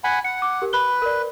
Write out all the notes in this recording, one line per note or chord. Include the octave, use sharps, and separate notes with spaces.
F#5 G#5 B5
F#5 C#7
D6
G4 A#4
B4 B5 F#6 G7
A#4 D5